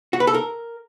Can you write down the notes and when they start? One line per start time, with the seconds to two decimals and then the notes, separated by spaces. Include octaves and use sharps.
0.13 F#4
0.20 B4
0.27 A4
0.34 A#4